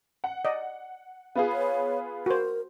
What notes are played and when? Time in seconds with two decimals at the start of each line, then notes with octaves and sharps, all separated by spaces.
0.24 F#5
0.45 D5 D#5
1.35 B3 F4 G#4
1.52 C#5
2.26 F#4 A#4 C5